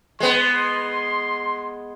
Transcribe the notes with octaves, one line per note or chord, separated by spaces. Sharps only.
G#3 B3 C6